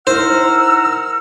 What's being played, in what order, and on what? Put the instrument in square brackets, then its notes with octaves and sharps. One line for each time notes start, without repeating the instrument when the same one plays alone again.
[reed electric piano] D#4 E4 A#4 [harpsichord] C5 [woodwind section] F#5 A#5 F6 [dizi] E6